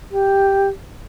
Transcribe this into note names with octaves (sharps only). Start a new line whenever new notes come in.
G4